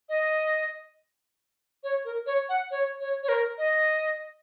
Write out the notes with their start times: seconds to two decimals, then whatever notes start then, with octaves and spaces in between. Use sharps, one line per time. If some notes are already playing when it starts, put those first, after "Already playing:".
0.09 D#5
1.84 C#5
2.05 A#4
2.26 C#5
2.49 F#5
2.71 C#5
3.00 C#5
3.23 C#5
3.29 A#4
3.58 D#5